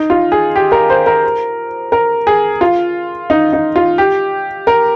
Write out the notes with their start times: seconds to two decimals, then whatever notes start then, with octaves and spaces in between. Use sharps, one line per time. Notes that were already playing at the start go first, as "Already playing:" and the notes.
Already playing: D#4
0.10 F4
0.32 G#4
0.56 G4
0.72 A#4
0.90 C5
1.06 A#4
1.92 A#4
2.27 G#4
2.61 F4
3.30 D#4
3.53 D#4
3.76 F4
3.98 G4
4.67 A#4